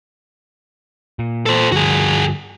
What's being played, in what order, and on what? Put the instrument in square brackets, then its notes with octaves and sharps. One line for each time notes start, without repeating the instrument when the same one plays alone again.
[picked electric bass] A#2
[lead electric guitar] A4 C5
[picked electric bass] G2 D3 F3 [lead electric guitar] F#4 G#4